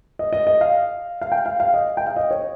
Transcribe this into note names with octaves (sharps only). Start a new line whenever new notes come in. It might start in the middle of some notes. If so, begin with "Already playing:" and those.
D#5
D#5
D#5
F5
F5
G5
F5
F5
D#5
G5
F5
D#5
C#5